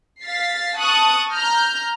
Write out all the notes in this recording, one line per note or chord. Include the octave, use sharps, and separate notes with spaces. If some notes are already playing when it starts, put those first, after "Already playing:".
F5 A6 B6 C7
A5 C#6 D#6 F#6
A#5 F6 G6